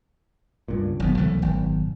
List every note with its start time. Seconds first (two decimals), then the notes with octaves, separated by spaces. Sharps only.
0.68 C#2 G2 A#2
1.00 F#1 B1 D#3 B3
1.17 C2 E3 A3
1.42 G#1